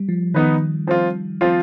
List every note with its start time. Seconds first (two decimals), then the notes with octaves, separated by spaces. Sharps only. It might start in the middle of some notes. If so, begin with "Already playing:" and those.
Already playing: G3
0.09 F3
0.34 D#3 B3 D#4 B4
0.87 F3 C4 F4
1.41 F3 C4 F4